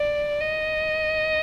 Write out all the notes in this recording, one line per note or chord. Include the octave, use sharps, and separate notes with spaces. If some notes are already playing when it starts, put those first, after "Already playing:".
Already playing: D5
D#5